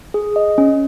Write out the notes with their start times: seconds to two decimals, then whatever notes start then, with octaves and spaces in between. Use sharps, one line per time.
0.14 G#4
0.36 D#5
0.58 C#4